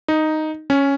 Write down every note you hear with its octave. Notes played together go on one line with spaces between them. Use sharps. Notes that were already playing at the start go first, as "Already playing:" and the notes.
D#4
C#4